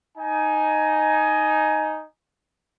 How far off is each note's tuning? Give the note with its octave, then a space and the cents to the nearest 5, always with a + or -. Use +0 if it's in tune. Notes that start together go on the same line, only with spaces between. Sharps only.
D#4 +0 G#5 +15